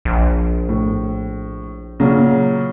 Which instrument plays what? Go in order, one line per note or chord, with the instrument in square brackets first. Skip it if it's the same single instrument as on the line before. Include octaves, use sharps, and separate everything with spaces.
[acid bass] A#1
[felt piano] A2
A#2 C#3 F#3